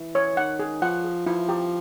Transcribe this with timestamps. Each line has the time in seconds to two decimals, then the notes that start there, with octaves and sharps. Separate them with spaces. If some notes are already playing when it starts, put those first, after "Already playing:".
Already playing: E3
0.15 C#5
0.37 D#3 F#5
0.59 G#4
0.82 F3 F#5
1.04 G#4
1.26 F3 E4
1.49 G4